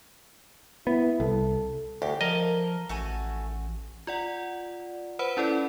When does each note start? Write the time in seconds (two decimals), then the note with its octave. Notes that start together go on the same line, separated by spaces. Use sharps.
0.87 B3 E4
1.20 C2 A4
2.02 D2 G4
2.21 F3 A#3 A4 A#4 D#5
2.89 A1 A3 F#4 G#5
4.07 F4 D5 F#5
5.19 B4 C5 F#5 B5
5.37 C#4 E4 A4 D5